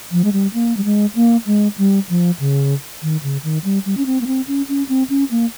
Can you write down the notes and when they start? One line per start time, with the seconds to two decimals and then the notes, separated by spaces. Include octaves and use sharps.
0.12 F3
0.24 G#3
0.33 G3
0.54 A#3
0.77 G3
0.84 G#3
1.15 A#3
1.46 G#3
1.78 G3
2.09 F3
2.40 C#3
3.02 D#3
3.23 C#3
3.44 D#3
3.64 G3
3.86 G3
3.97 C#4
4.06 C4
4.21 A#3
4.27 C4
4.48 C#4
4.69 C#4
4.89 C4
5.10 C#4
5.31 A#3